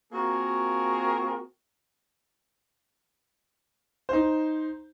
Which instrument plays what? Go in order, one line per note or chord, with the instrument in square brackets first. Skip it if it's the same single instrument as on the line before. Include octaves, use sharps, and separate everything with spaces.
[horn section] A#3 C4 F4 F#4 G#4 A#4
[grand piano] D#4 C5